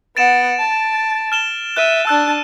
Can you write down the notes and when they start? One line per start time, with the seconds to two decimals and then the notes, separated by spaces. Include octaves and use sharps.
0.17 B3 F#5 A6 D7 E7
0.59 A5
1.32 F6 E7 G7
1.77 E5 F#6 D#7
2.07 D4 A5 E6 F#6